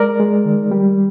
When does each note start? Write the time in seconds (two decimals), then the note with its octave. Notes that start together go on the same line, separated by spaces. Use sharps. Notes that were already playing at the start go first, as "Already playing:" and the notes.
Already playing: G#3 A#4 D5
0.20 G#3
0.45 D#3
0.71 G3